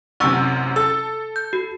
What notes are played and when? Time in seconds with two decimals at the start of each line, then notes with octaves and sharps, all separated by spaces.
0.20 A1 F#2 C3 F#5 C#6 E6
0.76 A4 E6
1.36 G6
1.53 F#4